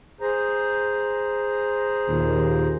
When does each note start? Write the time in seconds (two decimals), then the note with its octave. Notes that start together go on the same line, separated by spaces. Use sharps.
0.21 G#4 C5 A#5
2.09 D#2 A#2